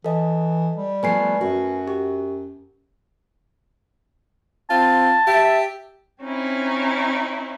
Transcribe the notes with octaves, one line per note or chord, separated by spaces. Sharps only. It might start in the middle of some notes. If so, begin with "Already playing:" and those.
E3 A4 D#5
G3
F3 A3 B3 B4 G#5 C7
F#2 F#4
G4
C4 F4 A5
G4 E5
C4 C#4 D#4 E4